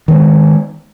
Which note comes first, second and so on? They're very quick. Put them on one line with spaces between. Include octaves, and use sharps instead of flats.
D#3 B3 G#3